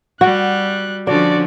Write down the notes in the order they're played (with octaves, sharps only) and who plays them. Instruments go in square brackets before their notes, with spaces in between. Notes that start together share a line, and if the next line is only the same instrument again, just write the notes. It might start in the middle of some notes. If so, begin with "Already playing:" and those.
[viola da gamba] G3 [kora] F#4 [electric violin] F#6
[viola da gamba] D3 F3 C#4 [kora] D4 [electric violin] F#4 D5